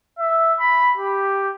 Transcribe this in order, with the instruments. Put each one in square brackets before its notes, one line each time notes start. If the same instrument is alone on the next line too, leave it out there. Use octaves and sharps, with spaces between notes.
[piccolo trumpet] E5
B5
G4